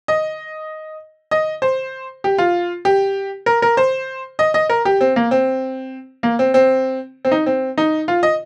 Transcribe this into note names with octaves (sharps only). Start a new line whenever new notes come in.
D#5
D#5
C5
G4
F4
G4
A#4
A#4
C5
D#5
D#5
A#4
G4
C4
A#3
C4
A#3
C4
C4
C4
D#4
C4
D#4
F4
D#5